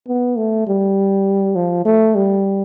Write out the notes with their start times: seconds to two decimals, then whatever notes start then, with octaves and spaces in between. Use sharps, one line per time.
0.08 B3
0.37 A3
0.67 G3
1.55 F3
1.85 A3
2.15 G3